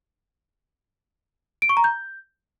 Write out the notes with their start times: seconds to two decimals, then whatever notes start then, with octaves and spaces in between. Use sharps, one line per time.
1.62 D7
1.69 C#6
1.77 A#5
1.84 G6